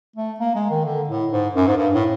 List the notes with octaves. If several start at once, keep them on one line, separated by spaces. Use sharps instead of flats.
A3
A#3
G#3
D#3
D3
A2
G#2
F#2
G#2
G2
A2